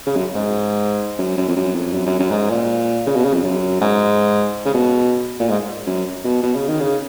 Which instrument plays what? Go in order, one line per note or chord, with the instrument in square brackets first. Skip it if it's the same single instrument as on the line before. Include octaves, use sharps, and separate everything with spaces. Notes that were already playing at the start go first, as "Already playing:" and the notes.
[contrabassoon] C#3
F#2
G#2
F#2
F#2
F2
F#2
F2
F#2
F#2
F#2
G#2
A#2
C#3
B2
C#3
F2
F#2
G#2
C#3
B2
A#2
G#2
F#2
B2
B2
C#3
D#3
C#3